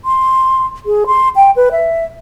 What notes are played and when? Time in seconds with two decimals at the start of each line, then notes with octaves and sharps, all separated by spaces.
0.05 C6
0.86 G#4
1.06 C6
1.36 G5
1.56 B4
1.71 E5